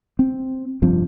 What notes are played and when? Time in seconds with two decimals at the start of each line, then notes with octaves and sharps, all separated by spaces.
0.19 C4
0.82 F1 G2 F3 C4